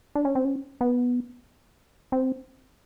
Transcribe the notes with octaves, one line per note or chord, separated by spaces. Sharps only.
D4
C#4
C4
C#4
B3
C4